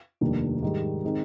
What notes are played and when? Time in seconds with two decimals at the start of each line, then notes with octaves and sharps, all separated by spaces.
0.21 F1 D#2 D#3 G3 D4
0.63 G#2 D#3 G3
1.04 D#3 G#3 C4 D#4